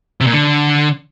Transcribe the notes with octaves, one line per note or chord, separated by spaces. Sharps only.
C3
A#2
D3